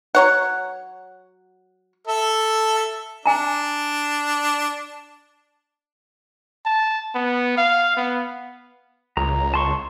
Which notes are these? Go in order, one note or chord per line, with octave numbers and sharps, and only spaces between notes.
F#3 C#5 F#5
A4 E5
D4 G#5 A#5
A5
B3
F5
B3
C#2 A#5
A5 C6 C#6